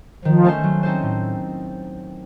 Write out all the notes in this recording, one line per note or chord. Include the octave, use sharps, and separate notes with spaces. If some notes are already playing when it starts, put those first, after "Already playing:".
D#3 F3
A3 C#4 A4 C5
F#3
C4 D#4 A4 C5
A2